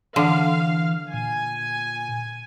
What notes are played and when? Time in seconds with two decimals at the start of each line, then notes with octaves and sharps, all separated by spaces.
0.16 D3 E3 F5
1.14 A#2 G#5